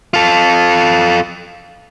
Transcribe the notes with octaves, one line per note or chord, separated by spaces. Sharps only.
F4 A4